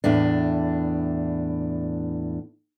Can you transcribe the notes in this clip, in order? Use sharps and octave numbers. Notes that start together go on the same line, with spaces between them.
E2 A2 D4